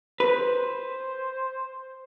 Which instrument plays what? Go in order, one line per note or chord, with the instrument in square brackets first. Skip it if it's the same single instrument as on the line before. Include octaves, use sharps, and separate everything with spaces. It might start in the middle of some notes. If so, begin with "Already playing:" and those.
[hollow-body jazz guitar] B4 [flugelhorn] C5